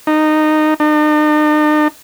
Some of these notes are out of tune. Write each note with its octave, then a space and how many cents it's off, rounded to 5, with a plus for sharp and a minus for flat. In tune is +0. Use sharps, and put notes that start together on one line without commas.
D#4 -15
D#4 -45